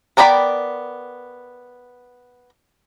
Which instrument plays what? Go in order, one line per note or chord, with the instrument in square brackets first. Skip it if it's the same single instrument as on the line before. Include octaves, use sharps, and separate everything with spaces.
[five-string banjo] B3 A#4 D5 G5 B5